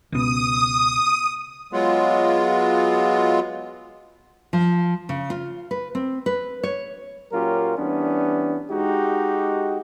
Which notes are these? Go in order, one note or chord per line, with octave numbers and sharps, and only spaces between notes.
C#2 B2 D#6
F#3 G#3 B3 F4
F3
C#3
F4
B4
C4
B4
C#5
A#2 F#3 C#4 F4 G4 A#4
E3 G3 B3 C#4 D4
G#3 D#4 F#4 G4